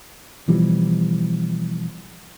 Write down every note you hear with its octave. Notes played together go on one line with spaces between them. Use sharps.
B2 E3 F3 G3